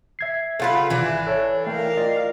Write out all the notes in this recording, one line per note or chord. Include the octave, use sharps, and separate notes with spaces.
E5 G#6 C7
C#3 F4 A4 B4 F#5 B5
G#1 E3 D4
A4 C#5 A5
A3 A#4 F5 G5
F4 D5 D#5